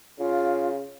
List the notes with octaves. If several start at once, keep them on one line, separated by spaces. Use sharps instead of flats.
C#3 F4